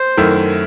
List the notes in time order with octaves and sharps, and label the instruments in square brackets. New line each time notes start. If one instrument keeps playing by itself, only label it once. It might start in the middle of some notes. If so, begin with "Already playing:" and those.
Already playing: [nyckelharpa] C5
[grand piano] F#2 D#3 A3 E4